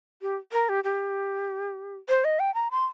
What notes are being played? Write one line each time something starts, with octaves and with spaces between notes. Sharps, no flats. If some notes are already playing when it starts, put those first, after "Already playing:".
G4
A#4
G4
G4
C5
D#5
G5
A#5
C6